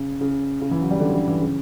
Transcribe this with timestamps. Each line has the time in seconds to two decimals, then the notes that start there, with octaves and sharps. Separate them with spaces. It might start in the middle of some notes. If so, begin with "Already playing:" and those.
Already playing: C#3
0.21 C#3
0.61 C#3
0.71 E3
0.81 F#3
0.91 G3
1.00 D3
1.13 D3
1.28 E3
1.41 C#3